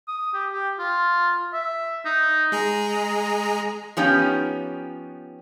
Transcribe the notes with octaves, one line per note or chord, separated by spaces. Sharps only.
D#6
G4
G4
F4
E5
D#4
G#3 G#4 A#5
F3 B3 C#4 D#4 G4